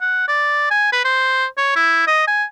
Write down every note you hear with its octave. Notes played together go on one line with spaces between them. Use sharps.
F#5
D5
G#5
B4
C5
C#5
E4
D#5
G#5